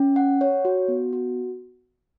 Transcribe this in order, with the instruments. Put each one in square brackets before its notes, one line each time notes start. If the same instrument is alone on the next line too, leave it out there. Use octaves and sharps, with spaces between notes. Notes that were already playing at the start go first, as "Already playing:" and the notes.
Already playing: [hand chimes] C#4
F#5
C#5
F#4
B3
F#4